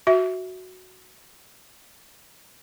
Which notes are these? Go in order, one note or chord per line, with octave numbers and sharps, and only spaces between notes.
F#4 E5